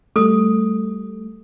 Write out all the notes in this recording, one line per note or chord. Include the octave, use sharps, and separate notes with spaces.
G3 A3 A4 D#6